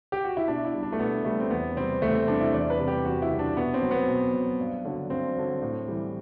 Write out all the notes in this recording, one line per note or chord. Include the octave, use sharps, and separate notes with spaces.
G4
F#4
E4
B2 D4
E4
G3
D4
A3
B2 B3
G3 A3
C4
E2 B3
C3 G3 C4
E2 A3
C4
C3 G3 D4
E4
E2 D5
B4
C3 G3
G4
E2 F#4
E4
C3 G3
D4
B2 B3
C4
F#3
B3
B2
F#3
G2
D3 F#3
G2 C4
D3 F#3
A2
E3 G3